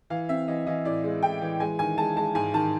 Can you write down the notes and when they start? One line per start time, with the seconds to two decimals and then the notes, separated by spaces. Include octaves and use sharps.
0.10 E3 F5
0.29 C4 E5
0.48 E3 D#5
0.66 E3 D#5
0.85 A2 D5
1.04 G#3
1.23 A2 G5
1.41 E3
1.60 G#3 G#5
1.79 D#3 G#5
1.98 G#3 A5
2.17 G#3 A5
2.35 G#2 G#5
2.54 D#3 A5